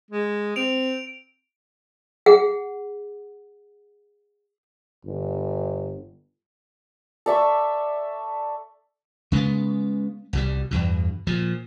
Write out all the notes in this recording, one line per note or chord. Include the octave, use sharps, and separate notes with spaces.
G#3
C4 D7 F7
G#4 F#5
G1
A4 D5 E5 C#6
C#3 G#3 A#3 B3
C2 B2 G3
E2 G2 B2
A#2 F3